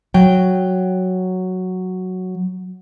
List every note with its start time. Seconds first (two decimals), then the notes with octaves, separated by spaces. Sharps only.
0.14 F#3 G5